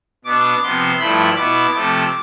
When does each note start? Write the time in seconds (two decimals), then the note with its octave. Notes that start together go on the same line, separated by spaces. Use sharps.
0.25 B2 B3 D4 D6
0.63 C3 F3 B3 C6
0.99 G2 F3 A3 E4 B5
1.36 B2 B3 E4 D6
1.74 C3 F3 A3 D6